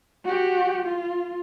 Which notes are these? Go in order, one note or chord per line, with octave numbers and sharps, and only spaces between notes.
F#4 G4
F4